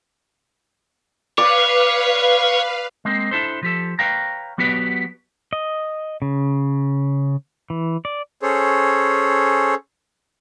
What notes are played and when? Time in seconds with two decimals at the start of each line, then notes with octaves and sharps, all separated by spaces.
1.38 B4 C#5 D5 F5
3.05 G#3 A#3 C4
3.31 D4 E4 A4 C5
3.63 F3 G4 A4
3.99 B4 C#5 F5 G5 A#5
4.58 F#3 B3 F#4 G4 B4 D5
5.53 D#5
6.22 C#3
7.70 E3
8.05 D5
8.41 C#4 G#4 A4 C5 C#5